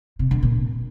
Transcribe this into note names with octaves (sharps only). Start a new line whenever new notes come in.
C3
D3
A#2